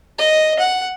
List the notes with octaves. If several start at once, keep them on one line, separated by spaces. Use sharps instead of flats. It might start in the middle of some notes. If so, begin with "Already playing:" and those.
D#5
F#5